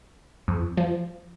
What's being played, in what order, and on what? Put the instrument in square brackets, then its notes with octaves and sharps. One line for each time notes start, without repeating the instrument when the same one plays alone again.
[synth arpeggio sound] F2
F3